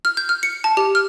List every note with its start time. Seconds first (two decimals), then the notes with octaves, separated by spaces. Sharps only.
0.05 F6
0.17 G6
0.29 F6
0.43 C#7
0.64 A5
0.77 G4
0.95 F6